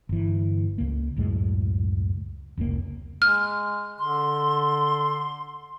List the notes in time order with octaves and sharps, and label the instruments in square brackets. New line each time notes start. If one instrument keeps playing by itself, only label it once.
[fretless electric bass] G1 E3
C#2 A#3
C#2 F#2 A2 G#3
F1 C#2 B2 A#3
[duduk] G#3 [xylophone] F6
[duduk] D3 [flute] C6